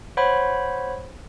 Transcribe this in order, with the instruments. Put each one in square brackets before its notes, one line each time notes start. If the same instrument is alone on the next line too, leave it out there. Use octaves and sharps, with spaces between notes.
[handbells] C5 C#5 F#5 B5